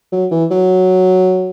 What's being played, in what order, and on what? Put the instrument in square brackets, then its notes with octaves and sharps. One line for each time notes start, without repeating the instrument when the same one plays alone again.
[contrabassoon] F#3
E3
F#3